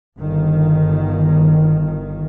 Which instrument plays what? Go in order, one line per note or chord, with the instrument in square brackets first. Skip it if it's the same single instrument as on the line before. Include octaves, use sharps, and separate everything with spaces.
[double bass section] G1 D#3